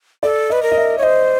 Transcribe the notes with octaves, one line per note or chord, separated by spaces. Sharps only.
A4 D5
B4 D#5
A#4
D#5
E5
C#5
C5 D#5